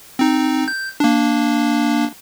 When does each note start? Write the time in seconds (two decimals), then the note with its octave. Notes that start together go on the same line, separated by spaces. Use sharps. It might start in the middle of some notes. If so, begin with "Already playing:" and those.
0.19 C4 D#4
0.68 G6
1.00 A#3 D4